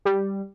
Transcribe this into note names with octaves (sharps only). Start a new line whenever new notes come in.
G3